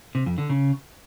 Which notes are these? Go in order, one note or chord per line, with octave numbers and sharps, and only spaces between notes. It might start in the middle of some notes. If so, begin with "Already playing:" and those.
C3
F2
D3
C#3